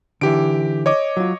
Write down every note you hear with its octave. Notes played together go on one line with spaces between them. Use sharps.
D3 E3 G4 D7
C#5 D#5 D6
F#3 F4